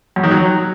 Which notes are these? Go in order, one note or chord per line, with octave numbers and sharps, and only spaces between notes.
F#2
D#3
F#3